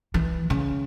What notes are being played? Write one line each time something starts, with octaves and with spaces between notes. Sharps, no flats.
E3
C#3